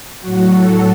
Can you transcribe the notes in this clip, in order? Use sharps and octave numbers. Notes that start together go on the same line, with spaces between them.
A2 F#3 F#4
A4